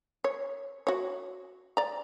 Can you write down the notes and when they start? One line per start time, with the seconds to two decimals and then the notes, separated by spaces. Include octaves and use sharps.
0.24 C#5
0.87 F#4 C#5
1.77 D5 A#5